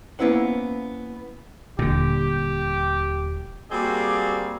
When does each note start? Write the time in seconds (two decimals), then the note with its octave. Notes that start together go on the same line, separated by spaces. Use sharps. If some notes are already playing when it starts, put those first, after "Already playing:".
0.19 A#3 B3 C#4 E4 C5 F#5
1.79 D#1 A#2 D3 G4
3.71 G3 A#3 C4 F#4 G#4 D5